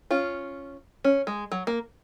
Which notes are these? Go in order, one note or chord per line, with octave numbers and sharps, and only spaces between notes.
C#4 F4
C#4
G#3
F#3
A#3